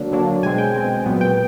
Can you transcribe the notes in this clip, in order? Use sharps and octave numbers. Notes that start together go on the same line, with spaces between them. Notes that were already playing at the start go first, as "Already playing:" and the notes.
Already playing: D3 F#3 A#3 D4
D3 F#3 A#3 D4
B2 G#3 C4 G#5
G5
B2 G#3 C4
A#2 F#3 B3
G5